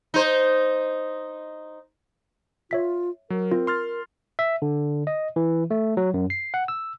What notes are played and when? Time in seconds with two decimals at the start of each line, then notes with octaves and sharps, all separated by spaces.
0.14 D#4 C5
2.71 F4 C#5 E5 B6
3.30 F#3 A#4
3.51 C4 F4
3.67 C6 F6 A6
4.39 E5
4.62 D3
5.07 D#5
5.36 E3
5.71 A3
5.97 F#3
6.14 F#2
6.30 C7
6.54 F#5
6.68 E6